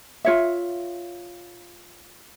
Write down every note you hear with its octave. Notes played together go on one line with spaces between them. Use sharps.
F4 C#5 E5